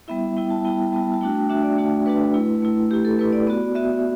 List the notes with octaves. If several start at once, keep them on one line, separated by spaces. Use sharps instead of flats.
G3 B3 E4 E5
G3 B3 E4 G5
A5
G3 B3 E4 G5
G3 B3 E4 A5
A5
A3 D4 F#4 G5
G5
A3 D4 F#4 E5
D5
A3 D4 F#4
A3 D4 F#4 B4
A3 E4
A3 E4
A3 E4 G4
A4
A3 E4 B4
D5
B3 F#4
B3 F#4 E5